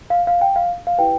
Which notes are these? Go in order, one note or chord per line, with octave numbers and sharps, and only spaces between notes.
F5
F5
G5
F5
F5
E4 G4 B4 G5